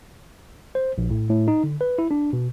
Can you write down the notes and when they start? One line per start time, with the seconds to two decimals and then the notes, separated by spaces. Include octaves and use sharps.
0.75 C5
0.98 A#1
1.11 A2
1.29 A2
1.48 D#4
1.64 D3
1.81 B4
1.98 E4
2.11 D4
2.33 B2